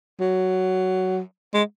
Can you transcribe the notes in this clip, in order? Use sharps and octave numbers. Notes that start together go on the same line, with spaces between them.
F#3
G#3